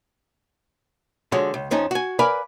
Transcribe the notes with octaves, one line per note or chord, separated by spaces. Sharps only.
D3 F3 G#3 F#4 C#5
C#2
F2 F3 C#4 D#4
F#4 G#5
A#4 B4 D5 F5 G#5 B5